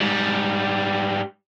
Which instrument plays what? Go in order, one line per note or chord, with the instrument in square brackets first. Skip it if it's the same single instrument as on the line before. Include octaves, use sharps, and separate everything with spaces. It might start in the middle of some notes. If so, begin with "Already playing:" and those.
[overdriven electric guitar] G#2 G3